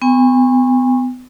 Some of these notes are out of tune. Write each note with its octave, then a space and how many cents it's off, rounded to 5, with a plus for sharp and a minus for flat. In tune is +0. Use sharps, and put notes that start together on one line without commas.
B3 +35 G#5 -40 C#6 -25